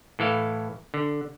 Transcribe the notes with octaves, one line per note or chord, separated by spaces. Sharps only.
A2 E3 A4 F5
D3